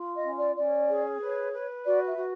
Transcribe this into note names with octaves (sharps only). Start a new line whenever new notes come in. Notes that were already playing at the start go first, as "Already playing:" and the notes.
Already playing: F4
D#5
C#4
D5
C#4 D5
G#4
B4 C#5
B4
F#4 D5
E5
F#4